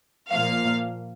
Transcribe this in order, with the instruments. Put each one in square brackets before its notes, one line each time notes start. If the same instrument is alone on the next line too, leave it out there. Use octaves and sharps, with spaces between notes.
[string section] A#2 F3 A#3 F5